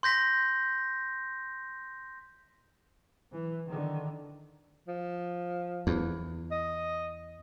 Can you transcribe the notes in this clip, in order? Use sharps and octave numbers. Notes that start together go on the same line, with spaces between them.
C6 G6 A#6 B6
E3
D3 D#3
F3
E2
D#5